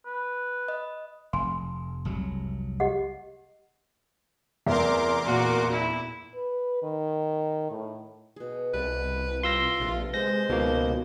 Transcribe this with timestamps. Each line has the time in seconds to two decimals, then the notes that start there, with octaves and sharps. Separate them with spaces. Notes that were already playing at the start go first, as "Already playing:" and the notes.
0.06 B4
0.68 D#5
1.33 F1 G#5 C6
2.05 F1 C2 F#3
2.80 G4 D#5 F#5
4.66 F1 E2 A#4 E5 C6 D6
5.24 A#2 F#4
5.72 E4
6.35 B4
6.83 D#3
7.71 A2
8.36 B2 G#4
8.73 C2 B4 D5
9.43 F4 C6 E6 A#6
9.80 A#1 C3 B3 A4
10.14 G#3 C5 A#6
10.49 C#2 B2 D#3 F3 A#3 F5